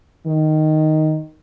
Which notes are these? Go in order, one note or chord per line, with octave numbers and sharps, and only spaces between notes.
D#3